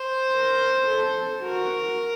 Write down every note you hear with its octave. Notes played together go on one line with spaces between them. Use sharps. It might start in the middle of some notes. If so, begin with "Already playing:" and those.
Already playing: C5
A#4
A4
F#4 A#4